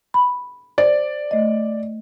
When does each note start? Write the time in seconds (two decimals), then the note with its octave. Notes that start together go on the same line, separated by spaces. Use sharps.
0.14 B5
0.78 C5 D5
1.31 A3 D#5